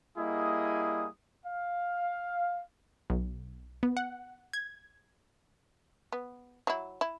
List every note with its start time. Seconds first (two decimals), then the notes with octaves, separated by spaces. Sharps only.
0.17 G3 A#3 E4 G#4 D#5 D#6
1.45 F5
3.10 B1
3.83 B3
3.97 F#5
4.53 G#6
6.12 B3
6.67 F#3 E4
7.01 E4